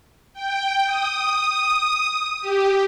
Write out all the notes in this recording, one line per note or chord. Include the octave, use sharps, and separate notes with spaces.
G5
D#6
G4